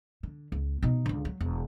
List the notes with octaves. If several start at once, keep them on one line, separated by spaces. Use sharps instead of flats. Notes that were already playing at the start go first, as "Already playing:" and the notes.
D3
C#2
B2 D#4
C#2 D3
F#3
E1